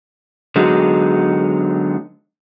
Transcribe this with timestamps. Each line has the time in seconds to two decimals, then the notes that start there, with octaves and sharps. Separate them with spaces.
0.56 D3 F#3 G#3 B3 D#4